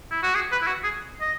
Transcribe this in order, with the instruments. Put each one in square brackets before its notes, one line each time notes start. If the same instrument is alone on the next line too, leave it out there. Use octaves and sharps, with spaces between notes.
[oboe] E4
F#4
G#4
B4
E4
F#4
G#4
D#5